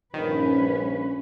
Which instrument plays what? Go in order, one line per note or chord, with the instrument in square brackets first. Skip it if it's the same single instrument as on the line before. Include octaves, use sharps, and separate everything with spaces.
[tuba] A#1 [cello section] G2 C#4 B4 [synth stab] D#3